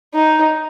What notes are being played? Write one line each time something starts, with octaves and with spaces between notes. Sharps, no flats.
D#4